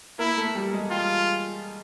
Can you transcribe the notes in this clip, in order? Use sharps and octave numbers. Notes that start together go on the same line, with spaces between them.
A#3 E4 A#4
A3 A4
G3 G4
G#3 G#4
G3 F4 G4